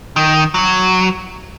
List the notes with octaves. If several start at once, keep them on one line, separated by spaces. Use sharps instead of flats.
D#3
F#3